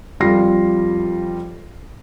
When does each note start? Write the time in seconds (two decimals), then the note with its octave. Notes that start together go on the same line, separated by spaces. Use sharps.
0.20 F2 G3 F4 A#6 C7